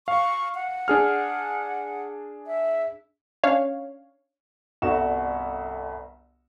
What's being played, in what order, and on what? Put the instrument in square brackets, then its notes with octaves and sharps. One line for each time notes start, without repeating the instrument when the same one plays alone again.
[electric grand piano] F5 [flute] C#6
[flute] F#5
[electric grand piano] D4 G#4 F6
[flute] E5
[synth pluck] C#4 D4 C#5 F5
[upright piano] G1 C2 F#4 C#6 E7